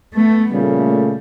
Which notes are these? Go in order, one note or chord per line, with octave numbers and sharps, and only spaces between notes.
A3 B3
A#2 C#3 G3 A3